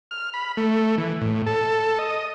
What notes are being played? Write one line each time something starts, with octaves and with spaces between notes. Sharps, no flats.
F6
B5
A3
E3
A2
A4
D#5